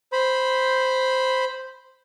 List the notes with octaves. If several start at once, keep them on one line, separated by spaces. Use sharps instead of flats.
C5 B5